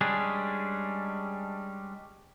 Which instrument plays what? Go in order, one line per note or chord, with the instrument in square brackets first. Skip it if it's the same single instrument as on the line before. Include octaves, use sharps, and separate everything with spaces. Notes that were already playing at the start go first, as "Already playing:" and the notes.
[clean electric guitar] G3 G#3 C#4 D4 G#4